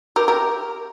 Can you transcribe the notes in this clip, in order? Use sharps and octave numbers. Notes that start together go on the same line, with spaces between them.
G4 A#4
G4 A#4